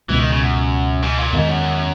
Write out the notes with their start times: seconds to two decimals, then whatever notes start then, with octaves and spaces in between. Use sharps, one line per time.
0.09 C#2 B2 E3 G#3 B3
0.19 D#3
0.30 C#3
0.40 F#2
1.02 G#2
1.18 A#2
1.33 E2 G#2 D#3 G#3
1.49 F#2